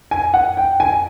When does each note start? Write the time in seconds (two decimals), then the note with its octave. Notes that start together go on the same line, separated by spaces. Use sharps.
0.11 G#5
0.34 F#5
0.57 G5
0.80 G#5